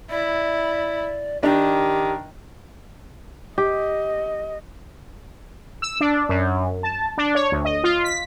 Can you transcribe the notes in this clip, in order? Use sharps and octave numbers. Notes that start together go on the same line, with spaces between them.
E4 D5
D#3 D4 G4
G4 D#5
E6
D4
F#2
A5
D4
C#5
D2
D#5
F4
B6